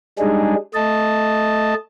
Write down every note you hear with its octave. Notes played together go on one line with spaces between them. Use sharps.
G3 G#3 D4 D#4 G#4
A3 D#5 A5